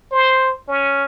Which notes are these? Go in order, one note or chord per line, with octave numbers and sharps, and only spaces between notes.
C5
C#4